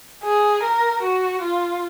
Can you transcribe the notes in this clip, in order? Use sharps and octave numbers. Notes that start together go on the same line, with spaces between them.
G#4
A#4
F#4
F4